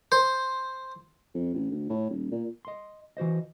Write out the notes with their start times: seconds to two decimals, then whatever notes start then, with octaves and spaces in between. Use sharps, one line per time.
0.12 C5
1.34 F2
1.54 A1
1.71 D2
1.89 A2
2.10 D#1
2.31 A#2
2.65 D#5 C6
3.17 E3 F#4 C5 D#5